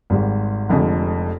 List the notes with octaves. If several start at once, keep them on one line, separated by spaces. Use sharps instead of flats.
G#1 G#2 G3
F1 F2 D3 G#3